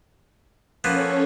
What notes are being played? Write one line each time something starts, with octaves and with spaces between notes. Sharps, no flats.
F3 A#3 B3 C#4 A4 C#5